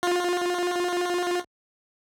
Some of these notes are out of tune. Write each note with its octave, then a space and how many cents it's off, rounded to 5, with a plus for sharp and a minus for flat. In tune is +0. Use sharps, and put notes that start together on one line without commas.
F4 +25